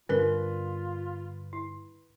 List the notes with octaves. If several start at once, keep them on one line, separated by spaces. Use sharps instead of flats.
G2 D3 G3 C#4 F4 A#4 B4
E4